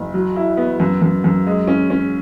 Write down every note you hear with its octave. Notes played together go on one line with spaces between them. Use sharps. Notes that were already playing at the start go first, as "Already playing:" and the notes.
Already playing: F#1
F#3
E4
B3
F#2
F#2
F#2
G#3
C#4
C#4